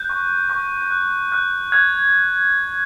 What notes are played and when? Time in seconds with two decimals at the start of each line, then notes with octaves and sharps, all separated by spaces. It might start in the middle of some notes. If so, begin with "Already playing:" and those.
Already playing: F#6 G6
0.09 C#6
0.50 C#6
0.90 F#6
1.32 F#6
1.72 F#6 G#6